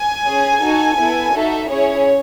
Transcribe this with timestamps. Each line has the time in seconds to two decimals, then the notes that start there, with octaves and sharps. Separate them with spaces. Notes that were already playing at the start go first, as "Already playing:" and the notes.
Already playing: G#5
0.25 C#4 G#4
0.61 D#4 F#4 A4
0.97 B3 E4 A4
1.34 D#4 F#4 A4 E5
1.70 C#4 E4 G#4 C#5